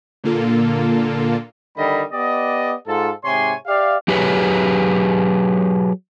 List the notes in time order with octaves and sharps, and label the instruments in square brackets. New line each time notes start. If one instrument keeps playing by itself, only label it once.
[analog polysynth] A#2 D3 A#3 F4 A4
[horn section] D3 D#3 G3 D#5 B5
B3 G4 D5 D#5
G#2 F4 A4
G#2 C3 C#5 G#5 C6
G4 D5 E5 F5
[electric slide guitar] F#3 G4 G#4 B4 C#5